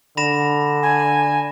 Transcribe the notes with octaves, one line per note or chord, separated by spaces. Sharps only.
D3 B5 A#6 E7
G#5